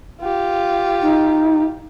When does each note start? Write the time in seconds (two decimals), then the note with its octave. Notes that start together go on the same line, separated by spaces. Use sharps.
0.21 F4 G4
1.02 D#4